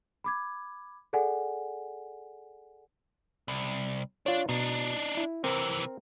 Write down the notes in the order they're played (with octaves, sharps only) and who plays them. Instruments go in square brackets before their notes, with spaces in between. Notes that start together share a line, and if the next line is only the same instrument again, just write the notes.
[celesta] B5 D6 G#6
G#4 A4 D5 F#5 G#5
[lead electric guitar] C2
[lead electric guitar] D4 [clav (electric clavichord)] F4 C#5
[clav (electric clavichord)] B2 [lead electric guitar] D4 D#4
[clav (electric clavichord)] E4
[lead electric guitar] C3 E3 [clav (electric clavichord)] C4 A#4